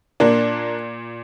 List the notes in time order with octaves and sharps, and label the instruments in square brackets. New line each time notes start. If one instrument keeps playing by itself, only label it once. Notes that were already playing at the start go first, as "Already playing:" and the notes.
[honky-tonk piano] A#2 A#3 D4